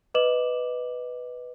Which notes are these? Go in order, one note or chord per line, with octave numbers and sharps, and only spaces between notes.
B4 D#5 D6 E7 F#7